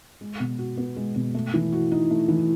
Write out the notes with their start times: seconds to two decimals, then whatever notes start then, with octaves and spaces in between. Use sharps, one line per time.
0.21 G#3
0.40 B2
0.59 F#4
0.77 B3
0.96 G#3
1.16 B2
1.34 A3
1.54 E3
1.72 F#4
1.92 D#4
2.11 A3
2.28 E3